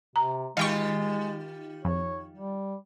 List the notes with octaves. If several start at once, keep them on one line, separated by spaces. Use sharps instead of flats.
C3 A#5
D#3 G#3 F4 G4 D#5 F5 G5 C#6
F2 C#5
G3